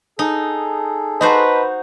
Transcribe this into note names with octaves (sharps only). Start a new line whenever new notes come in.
D#4 G#4 A4
D#4 F#4 B4 C5 D#5 A5